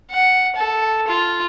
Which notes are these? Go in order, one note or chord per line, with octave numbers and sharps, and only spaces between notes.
F#5
A4
F4